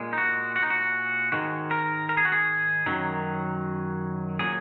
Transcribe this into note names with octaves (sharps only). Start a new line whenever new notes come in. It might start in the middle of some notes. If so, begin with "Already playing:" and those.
Already playing: A#2 G#3
D#4
F#4
F#4
D#4
F#4
G#2 D#3 G#3 F#4
A#4
A#4
G#4
F#4
G#4
F#2 D#3 F#3
A#2 F#3 G#4